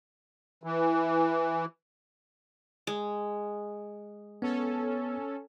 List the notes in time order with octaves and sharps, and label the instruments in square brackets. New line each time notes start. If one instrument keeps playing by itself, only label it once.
[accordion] E3
[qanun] G#3
[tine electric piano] B3 [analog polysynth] C#4 A4